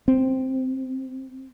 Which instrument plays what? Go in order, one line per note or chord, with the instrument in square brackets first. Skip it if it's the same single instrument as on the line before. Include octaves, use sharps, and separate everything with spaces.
[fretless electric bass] C4